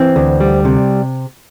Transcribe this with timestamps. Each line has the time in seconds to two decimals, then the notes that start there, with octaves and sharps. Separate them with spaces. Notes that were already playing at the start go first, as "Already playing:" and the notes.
Already playing: E3 C4
0.16 D2
0.40 G3
0.65 C3